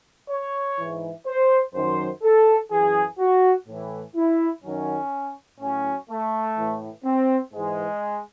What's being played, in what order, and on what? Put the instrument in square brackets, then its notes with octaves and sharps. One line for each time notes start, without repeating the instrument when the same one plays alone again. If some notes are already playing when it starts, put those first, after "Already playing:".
[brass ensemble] C#5
G#2 E3
C5
F#2 D#3 F#3 C5
A4
F#2 E3 G#4
F#4
A2 E3
E4
F#2 D#3 F#3 C#4
A2 F#3 C#4
A3
A2 E3
C4
G#2 E3 G#3